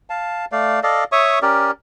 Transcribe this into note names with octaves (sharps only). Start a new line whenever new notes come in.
F5 A5
A3 D5 F5
A4 D5 D#5 F5
C#5 E5 C#6 D#6
C#4 G4 A#4 D5